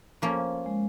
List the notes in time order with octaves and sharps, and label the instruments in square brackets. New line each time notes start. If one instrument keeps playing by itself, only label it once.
[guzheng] F3 A#3 C#4
[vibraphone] G#3